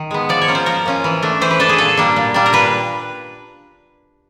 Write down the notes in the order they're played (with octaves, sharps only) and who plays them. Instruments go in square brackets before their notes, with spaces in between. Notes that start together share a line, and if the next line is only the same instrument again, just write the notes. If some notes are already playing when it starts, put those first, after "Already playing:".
Already playing: [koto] D#3
G#3 B3
F3 D5
C#5
A#3 C#4 F4
C5
F3 A#4
A#3 C#4 F4
E3
A3 D4
E3 C5
B4
A3 D4 A4
G#4
A#2 A4
G3 A#3 D4
A#2
G3 A#3 D4
A#4
A#2 B4